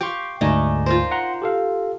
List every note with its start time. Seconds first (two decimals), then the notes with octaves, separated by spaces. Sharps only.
0.01 G4 F5 G5 C6 C#6
0.41 D2 G#2 A3 D4 D#4 G#5
0.86 F4 A#4 C5
1.11 F#5 A#5 C6
1.42 G4 A4 F5